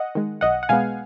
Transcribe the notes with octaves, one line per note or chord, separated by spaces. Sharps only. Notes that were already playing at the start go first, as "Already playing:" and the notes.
Already playing: D#5 F#5
D#3 G#3
B1 D#5 F#5
F#5
B2 G#3 B3 F5 G#5